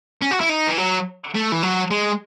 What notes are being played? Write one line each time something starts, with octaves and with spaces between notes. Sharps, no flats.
C#4
F#4
E4
D#4
E3
F#3
A3
E3
F#3
G#3